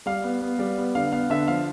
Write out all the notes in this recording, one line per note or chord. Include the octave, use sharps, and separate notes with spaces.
G3 F5
B3
B3
G3
B3
D3 F5
B3 F5
D3 E5
F3 F5